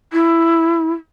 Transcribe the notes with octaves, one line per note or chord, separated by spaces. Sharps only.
E4